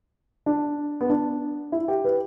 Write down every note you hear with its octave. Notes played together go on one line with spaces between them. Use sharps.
D4
B3
D4
E4
G4
B4